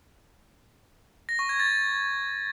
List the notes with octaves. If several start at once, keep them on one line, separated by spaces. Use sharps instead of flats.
A#6
C#6
G#6
A6